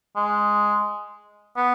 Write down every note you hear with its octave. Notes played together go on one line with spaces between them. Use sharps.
G#3
B3